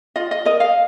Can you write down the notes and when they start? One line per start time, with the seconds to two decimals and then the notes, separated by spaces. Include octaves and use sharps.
0.16 F4 D#5
0.31 D#5
0.45 A#4 D#5
0.60 F5